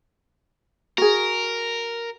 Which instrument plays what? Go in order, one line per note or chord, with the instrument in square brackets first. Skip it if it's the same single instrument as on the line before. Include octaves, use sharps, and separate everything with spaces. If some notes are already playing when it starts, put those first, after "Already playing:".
[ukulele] F#4 G#4 [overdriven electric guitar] A#4